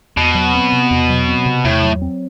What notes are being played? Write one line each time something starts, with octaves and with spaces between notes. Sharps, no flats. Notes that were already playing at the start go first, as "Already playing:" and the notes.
E2 B2
F#3
C4
C3
E2
F#3
C4
C3
E2 A2
F#3
C4